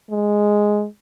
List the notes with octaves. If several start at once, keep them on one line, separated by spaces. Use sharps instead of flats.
G#3